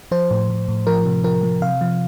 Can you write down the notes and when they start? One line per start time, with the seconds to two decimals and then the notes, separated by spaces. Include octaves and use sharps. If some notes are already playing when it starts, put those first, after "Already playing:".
0.11 F3 C5
0.31 A2
0.50 A2
0.68 A2
0.87 F3 A#4
1.06 C3
1.24 F3 A#4
1.43 F3
1.62 C3 F5
1.81 F3